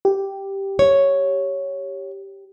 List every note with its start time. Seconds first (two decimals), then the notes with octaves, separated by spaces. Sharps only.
0.05 G4
0.79 C#5